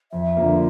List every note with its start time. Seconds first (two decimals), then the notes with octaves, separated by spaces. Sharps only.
0.12 F2 E5
0.37 D3 F3 A#3